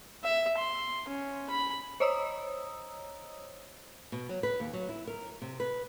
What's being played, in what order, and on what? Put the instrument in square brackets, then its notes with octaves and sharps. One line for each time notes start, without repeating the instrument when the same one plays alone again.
[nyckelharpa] E5
C6
C#4
B5
[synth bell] C5 C#5 D#5 A#5 D#6 E6
[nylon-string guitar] B2
F#3
B4
D#2
F#3
E4
A#4
C3
B4